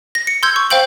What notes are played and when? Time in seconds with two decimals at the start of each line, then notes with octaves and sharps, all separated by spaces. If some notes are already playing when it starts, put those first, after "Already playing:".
0.15 A#6
0.27 C#7
0.43 C6 E6 G6 G#6
0.56 C#6
0.70 C5 F5 G5 G6 F#7